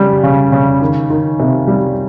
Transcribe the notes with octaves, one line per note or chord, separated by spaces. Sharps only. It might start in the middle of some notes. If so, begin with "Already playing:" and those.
Already playing: C#3 G3
C#3
C#3
D#3
D#3
C3
G3